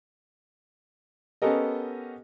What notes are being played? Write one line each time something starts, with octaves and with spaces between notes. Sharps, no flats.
B3 C#4 G4 A4 A#4 D#5